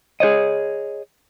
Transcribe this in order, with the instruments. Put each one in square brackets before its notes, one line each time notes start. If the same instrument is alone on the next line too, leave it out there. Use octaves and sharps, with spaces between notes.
[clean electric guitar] G#4 C5 C#5 D#5